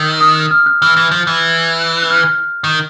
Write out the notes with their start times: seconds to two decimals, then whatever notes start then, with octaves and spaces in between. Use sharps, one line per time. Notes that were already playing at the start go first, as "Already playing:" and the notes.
Already playing: D#3 E6
0.21 D#6
0.35 F#6
0.51 F6
0.66 F#6
0.82 E3 F6
0.97 E3
1.11 F3
1.27 E3
2.02 F#6
2.10 F6
2.17 F#6
2.64 D#3